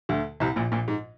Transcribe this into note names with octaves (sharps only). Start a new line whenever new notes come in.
D2 D3
C2 C3
A#1 A#2
A#1 A#2
G#2